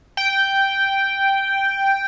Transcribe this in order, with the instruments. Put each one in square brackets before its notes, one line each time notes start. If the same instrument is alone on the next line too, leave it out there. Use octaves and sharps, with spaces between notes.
[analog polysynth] G5